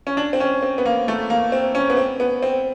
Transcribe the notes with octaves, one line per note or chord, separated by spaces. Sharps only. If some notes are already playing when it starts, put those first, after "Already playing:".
C#4
D4
C4
C#4
C4
B3
A#3
A3
A#3
C4
C#4
B3
C4
B3
C4